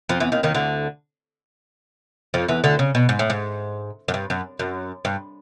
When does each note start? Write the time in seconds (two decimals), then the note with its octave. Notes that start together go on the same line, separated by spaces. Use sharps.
0.09 F2 F3
0.20 E2 E3
0.32 D#2 D#3
0.43 D#2 D#3
0.54 D2 D3
2.34 F2 F3
2.48 E2 E3
2.64 D2 D3
2.79 C#3
2.95 B2
3.09 G#2
3.19 A2
3.30 G#2
4.08 F#2
4.14 G2
4.30 F#2
4.59 F#2
5.05 G2